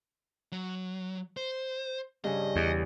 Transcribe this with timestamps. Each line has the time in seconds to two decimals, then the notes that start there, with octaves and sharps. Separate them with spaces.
0.52 F#3
1.37 C5
2.24 G2 C#3 D#5
2.56 E2